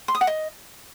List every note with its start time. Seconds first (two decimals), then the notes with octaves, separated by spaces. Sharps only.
0.08 C6
0.15 D#6
0.21 F#5
0.27 D#5